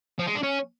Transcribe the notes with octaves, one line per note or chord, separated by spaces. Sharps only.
F3
G#3
D4
C#4